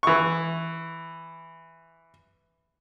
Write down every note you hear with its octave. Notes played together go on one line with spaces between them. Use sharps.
E3 C#6